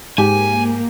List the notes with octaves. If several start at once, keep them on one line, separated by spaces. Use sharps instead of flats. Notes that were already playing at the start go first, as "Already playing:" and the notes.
G#2 A#3 G4 G#5